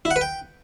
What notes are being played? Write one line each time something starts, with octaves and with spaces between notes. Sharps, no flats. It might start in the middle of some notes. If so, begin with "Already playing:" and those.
E4
F#5
B4
G5